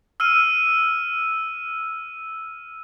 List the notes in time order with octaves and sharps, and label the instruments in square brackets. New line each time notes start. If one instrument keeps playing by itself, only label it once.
[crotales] E6 F6 D#7